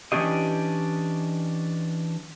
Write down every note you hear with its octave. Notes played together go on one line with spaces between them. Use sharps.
E3 A3 C#4 D4 G4 D#5